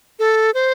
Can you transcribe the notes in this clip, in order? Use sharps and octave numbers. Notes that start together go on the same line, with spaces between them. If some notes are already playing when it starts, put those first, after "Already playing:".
A4
C5